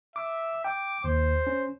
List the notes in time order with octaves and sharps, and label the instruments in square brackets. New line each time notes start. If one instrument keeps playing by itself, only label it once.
[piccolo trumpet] E5 [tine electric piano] D6
[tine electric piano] G5 [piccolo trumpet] D6
[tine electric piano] D#2 [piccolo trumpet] C5
[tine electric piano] C#4